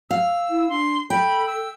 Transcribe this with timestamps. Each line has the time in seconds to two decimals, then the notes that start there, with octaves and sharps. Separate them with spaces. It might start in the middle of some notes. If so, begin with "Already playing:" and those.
0.11 F5 E6
0.50 E4
0.70 D4 C6
1.10 A4 G5 B5
1.47 E6